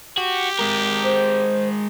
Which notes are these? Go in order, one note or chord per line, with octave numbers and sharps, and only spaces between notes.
F#4 G4
G#3 A#4
C5